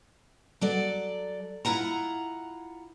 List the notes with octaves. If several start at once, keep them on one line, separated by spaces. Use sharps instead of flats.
F#3 A4 D5
E4 F4 F#5 A#5